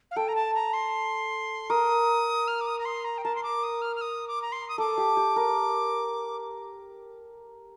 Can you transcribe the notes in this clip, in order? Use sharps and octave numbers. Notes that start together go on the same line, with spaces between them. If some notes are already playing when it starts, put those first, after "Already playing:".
F5
A4 G5
A#5
A5
A#5
C6
A#4 D#6
F6
D6
D#6
A#5
C6
A#5
G5
A#4 A5
C6
D6
D#6
F6
F6
D#6
D6
A#5
C6
D#6
A4 D6
G4
G4
A#4